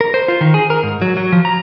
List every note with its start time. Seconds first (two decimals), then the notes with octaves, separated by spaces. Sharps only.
0.01 A#4
0.14 C5
0.28 F4
0.41 D#3
0.54 G#4
0.70 A#4
0.83 G#2
1.02 F#3
1.17 F#3
1.32 F3
1.45 A#5